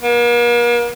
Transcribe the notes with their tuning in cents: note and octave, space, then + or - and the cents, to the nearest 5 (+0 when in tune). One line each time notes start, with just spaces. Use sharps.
A#3 +45